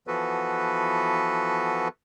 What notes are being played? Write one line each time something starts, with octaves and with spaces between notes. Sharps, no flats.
E3 F3 B3 F#4 A4 B4